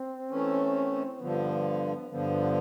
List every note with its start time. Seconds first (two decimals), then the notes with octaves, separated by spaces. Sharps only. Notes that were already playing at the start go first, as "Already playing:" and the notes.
Already playing: C4
0.30 E3 A3 C#4
1.20 G2 D3 F3 B3
2.11 G2 D3 F3 B3